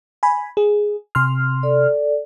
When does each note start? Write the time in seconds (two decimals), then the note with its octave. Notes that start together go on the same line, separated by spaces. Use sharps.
0.23 G#5 B5
0.57 G#4
1.15 C3 C6 F6
1.63 A4 D5